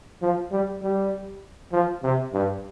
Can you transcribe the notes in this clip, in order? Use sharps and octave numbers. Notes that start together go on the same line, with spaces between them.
F3
G3
G3
F3
C3
G2